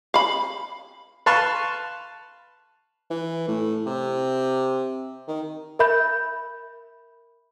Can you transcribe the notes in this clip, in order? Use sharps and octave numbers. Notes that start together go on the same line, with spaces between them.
F5 B5
B4 F5 A5 C6 C#6
E3
A2
C3
D#3
A#4 E5 B5 G6